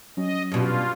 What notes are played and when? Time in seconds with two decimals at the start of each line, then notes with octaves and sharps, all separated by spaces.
0.17 F#3 C#4 D#5
0.52 G2 B2 F4